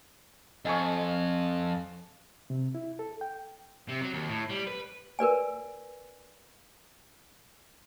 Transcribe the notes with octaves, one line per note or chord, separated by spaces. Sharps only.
F2 D#5 G#5 C#6
C3
E4
A4
G5
C3
F#3
D#2
A2
G3
B4
A#4 B4 D5 G#5